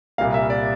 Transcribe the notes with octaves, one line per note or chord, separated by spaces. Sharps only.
C2 A#2 G3 A#3 F5
E5
D5